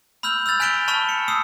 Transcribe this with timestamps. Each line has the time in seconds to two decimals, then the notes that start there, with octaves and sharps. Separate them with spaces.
0.23 B5 E6 F6 G6 F#7
0.46 E6 F6 G6 A6 F7
0.60 G#5 F#6 B6 D7 E7 G7
0.88 A5 B5 C#6 F6 E7 G7
1.09 C#7
1.28 D#6 E6 C7 C#7